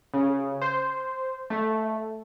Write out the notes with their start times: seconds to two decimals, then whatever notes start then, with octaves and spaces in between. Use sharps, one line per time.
0.14 C#3
0.62 C5
1.50 A3